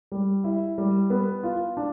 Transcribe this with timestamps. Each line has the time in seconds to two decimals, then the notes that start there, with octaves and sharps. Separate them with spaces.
0.12 G3
0.44 E4
0.78 G3
1.10 B3
1.43 F4
1.77 D4